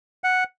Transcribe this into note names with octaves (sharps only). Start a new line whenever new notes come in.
F#5